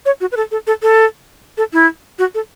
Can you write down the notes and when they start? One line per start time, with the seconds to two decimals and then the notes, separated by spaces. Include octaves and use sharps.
0.06 C#5
0.21 F#4
0.32 B4
0.37 A4
0.51 A4
0.67 A4
0.82 A4
1.58 A4
1.73 E4
2.19 F#4
2.35 A4